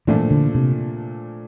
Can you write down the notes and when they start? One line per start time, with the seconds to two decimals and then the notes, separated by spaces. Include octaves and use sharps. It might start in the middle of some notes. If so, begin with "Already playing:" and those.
0.07 A#2 E3 F3 A3 D4
0.31 D3
0.55 C3